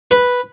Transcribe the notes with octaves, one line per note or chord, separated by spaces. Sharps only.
B4